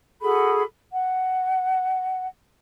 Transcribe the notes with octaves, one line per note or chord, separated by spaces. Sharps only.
F#4 G#4 A4 B5
F#5